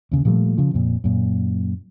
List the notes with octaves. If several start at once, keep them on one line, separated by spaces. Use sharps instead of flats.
D#2 C#3
A#2 F3 G3 A3
C#3 F3
F2 A#2
F#2 A#2